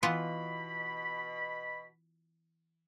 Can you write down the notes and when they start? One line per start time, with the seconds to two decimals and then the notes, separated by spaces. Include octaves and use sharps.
0.03 B2 E3 B3 F4 B5